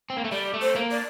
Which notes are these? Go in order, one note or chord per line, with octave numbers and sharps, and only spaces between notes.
C4
A#3
A3
G3 D5
A3
C5
A#3
D5